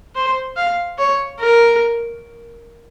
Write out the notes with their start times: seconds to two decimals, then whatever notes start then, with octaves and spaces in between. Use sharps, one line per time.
0.15 C5
0.56 F5
0.98 C#5
1.40 A#4